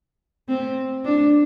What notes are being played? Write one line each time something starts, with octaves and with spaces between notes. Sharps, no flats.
C4
D4